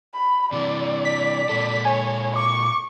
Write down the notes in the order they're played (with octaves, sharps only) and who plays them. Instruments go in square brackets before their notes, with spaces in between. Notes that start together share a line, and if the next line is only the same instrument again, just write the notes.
[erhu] B5
[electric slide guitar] C3 E3 [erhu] D5
[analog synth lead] B6
[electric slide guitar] A#2 A4
[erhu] C#5 [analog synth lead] G#5
[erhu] C#6 [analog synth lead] D6